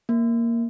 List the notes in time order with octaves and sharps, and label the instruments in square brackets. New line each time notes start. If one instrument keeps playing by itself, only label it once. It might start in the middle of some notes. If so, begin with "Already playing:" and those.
[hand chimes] A#3